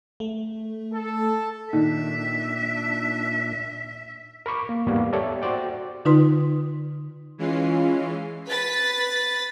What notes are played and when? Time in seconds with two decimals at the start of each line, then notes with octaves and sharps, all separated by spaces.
0.20 A3
0.93 A4
1.73 A#2 D#3 D4 E5
4.46 A#4 B5 C#6 D6
4.69 A#3
4.87 E2 G#2 G3 A#3 B3
5.13 G4 A4 C#5 D5 E5
5.42 F#4 C5 D5 G5
6.05 D3 D#4 F4 B4 C6 D#6
7.38 E3 G#3 C#4 F4 C7
8.48 B4 A6 B6